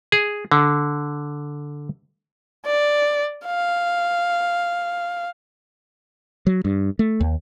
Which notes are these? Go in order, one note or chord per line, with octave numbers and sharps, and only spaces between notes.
G#4
D3
D5
F5
F#3
G2
A3
D#2